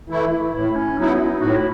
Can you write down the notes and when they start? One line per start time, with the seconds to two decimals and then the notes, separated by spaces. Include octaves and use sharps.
0.10 E3 A3 E4
0.31 E4
0.53 A2 E4
0.75 C#4
0.98 F#3 B3 D#4 E4
1.20 D#4
1.41 A2 F#4
1.55 E4